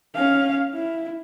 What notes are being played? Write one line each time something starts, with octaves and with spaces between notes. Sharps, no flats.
C#4 F5
E4